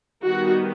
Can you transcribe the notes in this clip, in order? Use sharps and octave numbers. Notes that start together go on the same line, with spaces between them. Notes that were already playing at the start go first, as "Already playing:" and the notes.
D#3 G3 B3 F#4